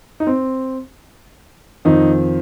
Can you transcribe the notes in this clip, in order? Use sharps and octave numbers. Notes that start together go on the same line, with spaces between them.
D#4
C4
F2 D#3 D#4